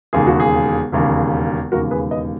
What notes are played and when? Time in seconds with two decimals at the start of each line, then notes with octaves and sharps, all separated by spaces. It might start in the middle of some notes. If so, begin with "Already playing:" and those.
0.13 E1 D#2 C#3 G#4
0.27 F#4
0.40 G#4
0.92 E1 D#2 C#3
1.72 E1 D#2 C#3 F#4 A#4
1.91 G#4 B4
2.11 B4 D#5